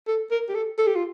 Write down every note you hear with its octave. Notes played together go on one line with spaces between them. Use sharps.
A4
A#4
G4
A4
A4
G4
F4